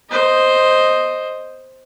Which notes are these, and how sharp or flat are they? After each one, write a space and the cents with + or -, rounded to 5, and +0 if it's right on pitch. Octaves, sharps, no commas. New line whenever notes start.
C5 +0 D#5 +0